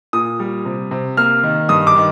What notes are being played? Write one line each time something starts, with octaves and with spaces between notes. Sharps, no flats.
A#2 D#6
G3
C3
C3
A#3 F6
D#3
G2 D#6
D6
D#3